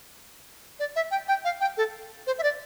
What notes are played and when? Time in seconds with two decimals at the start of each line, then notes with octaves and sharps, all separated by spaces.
0.80 D5
0.96 E5
1.11 G5
1.28 G5
1.45 F5
1.61 G5
1.77 A4
2.27 C5
2.38 E5
2.43 D5